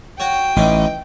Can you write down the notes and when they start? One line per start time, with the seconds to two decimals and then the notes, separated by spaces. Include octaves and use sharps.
0.20 F#4 C#5 G5
0.56 A1 E3 C#4 D#4